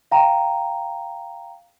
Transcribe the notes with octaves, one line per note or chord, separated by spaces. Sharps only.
F5 G5 A#5